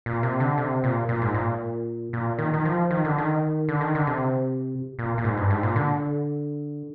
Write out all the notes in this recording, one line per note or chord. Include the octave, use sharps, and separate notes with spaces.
A#2
C3
D3
C3
A#2
A#2
G#2
A#2
A#2
D#3
D#3
F3
D#3
D3
D#3
D3
D#3
D3
C3
A#2
A#2
G#2
G2
G#2
A#2
D3